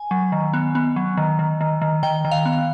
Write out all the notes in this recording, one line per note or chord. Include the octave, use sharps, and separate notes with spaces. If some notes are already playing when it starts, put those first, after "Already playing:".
Already playing: G#5
F#3
D#3
B3
B3
F#3
D#3
D#3
D#3
D#3
D#3 G5
D#3
F5
B3